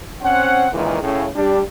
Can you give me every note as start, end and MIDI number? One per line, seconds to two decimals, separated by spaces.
0.22 0.67 60
0.22 0.67 61
0.22 0.67 72
0.22 0.67 78
0.72 1.01 37
0.72 1.01 46
0.72 1.01 51
0.72 1.01 52
0.72 1.01 56
1.02 1.26 45
1.02 1.26 49
1.35 1.60 55
1.35 1.60 62
1.35 1.60 67